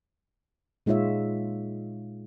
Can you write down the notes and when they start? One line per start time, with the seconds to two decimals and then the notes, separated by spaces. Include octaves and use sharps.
0.86 A#2 G#3 D#4 F4 C#5 E5